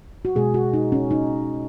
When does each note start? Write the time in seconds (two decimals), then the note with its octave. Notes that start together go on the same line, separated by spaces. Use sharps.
0.25 F#4
0.35 B2 G#3 G#4
0.54 F#4
0.74 D#4
0.92 C#4
1.11 D#4